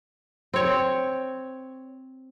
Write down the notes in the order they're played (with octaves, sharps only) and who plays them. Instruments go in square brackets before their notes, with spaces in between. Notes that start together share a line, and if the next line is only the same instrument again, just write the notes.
[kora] C4 C#5